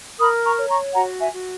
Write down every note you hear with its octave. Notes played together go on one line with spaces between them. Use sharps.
A#4 B5 D#6
A#5 C#6
C#5
A#5 C#6
F#4 F#5 A#5
E5 G#5
F#4